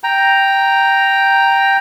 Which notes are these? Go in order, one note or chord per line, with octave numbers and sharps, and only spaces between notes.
G5 A#5